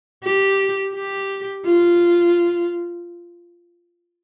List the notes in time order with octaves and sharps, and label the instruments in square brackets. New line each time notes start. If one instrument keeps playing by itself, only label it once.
[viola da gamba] G4
G4
F4